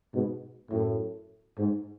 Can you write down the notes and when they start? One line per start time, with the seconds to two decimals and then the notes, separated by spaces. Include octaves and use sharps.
0.13 G#2 B2
0.71 F#2 A2
1.58 G#2